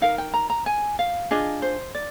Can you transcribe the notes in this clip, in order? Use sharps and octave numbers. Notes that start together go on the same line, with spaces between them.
D#4 A#4 F5
G5
A#5
A#5
G#5
F5
D4 F4 G#4 D#5
C5
D5